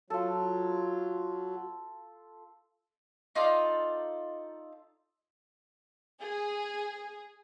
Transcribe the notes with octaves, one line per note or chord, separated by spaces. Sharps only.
F#3 F4 A4
D#4 F4 A4 D5
G#4